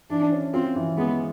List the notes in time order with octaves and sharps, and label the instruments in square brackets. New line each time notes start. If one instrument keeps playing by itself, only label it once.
[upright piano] E3 [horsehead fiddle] D4
[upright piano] C#4
[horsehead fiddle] C4 [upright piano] F4
[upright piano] E3
[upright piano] G#3 [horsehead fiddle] B3